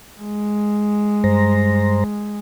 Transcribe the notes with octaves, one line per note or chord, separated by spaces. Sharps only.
G#3
G2 C5 A#5